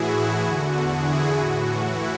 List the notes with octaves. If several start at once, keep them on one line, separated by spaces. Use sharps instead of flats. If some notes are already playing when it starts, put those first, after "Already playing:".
Already playing: A2 E3 E4 F#4 G#4
E4
E2 D3 F#4
E4 G#4
A2 E3 F#4
E4